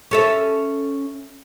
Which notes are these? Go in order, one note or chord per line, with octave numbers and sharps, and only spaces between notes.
C#4 A4 E5